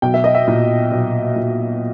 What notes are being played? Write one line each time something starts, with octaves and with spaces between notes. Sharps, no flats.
B1 G5
E5
D#5
E5
A#2
B1
A#2